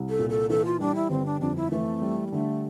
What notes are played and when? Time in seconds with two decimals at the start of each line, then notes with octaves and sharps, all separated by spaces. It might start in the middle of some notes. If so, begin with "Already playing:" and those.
Already playing: C2
0.09 A4
0.19 A#2
0.30 A4
0.50 E3 A4
0.65 F4
0.80 G3 D4
0.95 E4
1.10 G1 C4
1.26 D4
1.41 F2 D4
1.56 E4
1.71 E3 A3
2.02 G3
2.27 A#3
2.32 D3 A3